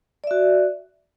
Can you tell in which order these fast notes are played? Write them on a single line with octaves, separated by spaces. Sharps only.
D5 E5 F#4